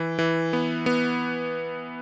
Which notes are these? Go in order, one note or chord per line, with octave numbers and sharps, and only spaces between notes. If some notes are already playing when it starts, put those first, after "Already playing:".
Already playing: E3
E3
B3
B3